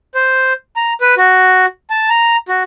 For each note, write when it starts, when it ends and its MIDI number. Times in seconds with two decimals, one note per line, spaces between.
0.15 0.53 72
0.76 0.93 82
1.01 1.15 71
1.18 1.66 66
1.90 2.09 81
2.10 2.37 82
2.48 2.63 66